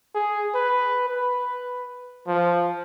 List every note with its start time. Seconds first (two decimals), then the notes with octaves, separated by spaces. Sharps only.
0.15 G#4
0.55 B4
1.08 B4
2.27 F3